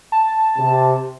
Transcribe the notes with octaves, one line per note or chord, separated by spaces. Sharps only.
A5
C3